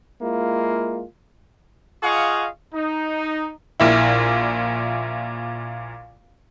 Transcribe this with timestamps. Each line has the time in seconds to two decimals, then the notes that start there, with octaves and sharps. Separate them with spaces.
0.20 G#3 A#3 E4 F4
2.02 F4 G#4 D#5 F5 F#5 C#6
2.73 D#4
3.80 A#1 A#2 E4